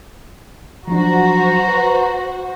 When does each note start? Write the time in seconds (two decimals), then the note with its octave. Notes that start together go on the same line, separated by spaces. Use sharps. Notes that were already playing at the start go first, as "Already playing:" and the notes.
0.88 F3 F#3 D4 F#4 C5 A#5
1.68 B4 F#5 A#6